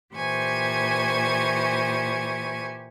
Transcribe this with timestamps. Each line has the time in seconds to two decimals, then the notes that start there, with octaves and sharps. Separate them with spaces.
0.13 A#2 E3 G4 C5 G#5 C#6